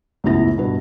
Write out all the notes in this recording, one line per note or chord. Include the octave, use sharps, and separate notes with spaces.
C#2 F#2 A2 B3 E4 A#6
G2 B2 B4